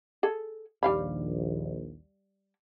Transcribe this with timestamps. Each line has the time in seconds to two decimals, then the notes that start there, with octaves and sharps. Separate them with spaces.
0.23 G#4 A4
0.83 A#1 D#2 G3 F5 B5